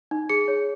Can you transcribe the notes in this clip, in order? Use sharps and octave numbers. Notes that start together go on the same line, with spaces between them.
D#4
G#4 C#7
C#5